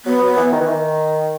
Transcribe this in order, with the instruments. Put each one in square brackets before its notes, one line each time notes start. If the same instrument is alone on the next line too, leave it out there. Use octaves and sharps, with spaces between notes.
[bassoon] F#3 [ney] B3
[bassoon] F#3
E3
D#3
E3
D#3